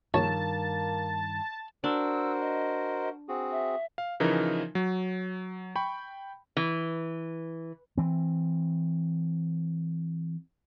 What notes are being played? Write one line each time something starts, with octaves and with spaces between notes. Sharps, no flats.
A#1 G2 D#3 A#3 C#5 A5
D4 F#4 A#4 C5 E6
D#5
C4 F#4 G#4
E5
F5
C#3 E3 F3 D#4 A#4
F#3
G5 B5 C#6
E3
E3 C4